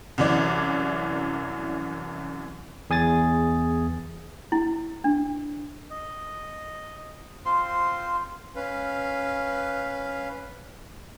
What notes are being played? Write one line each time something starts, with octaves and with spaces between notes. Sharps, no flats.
C2 F#2 E3 D5
E2 G#4 G#5 D#6 A6
E4
D4
D#5
C4 F4 C5 C6
C#4 B4 F5